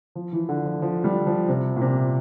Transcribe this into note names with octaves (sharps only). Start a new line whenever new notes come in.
F3
E3
D3
F3
F3
G3
F3
C3
A#2
C3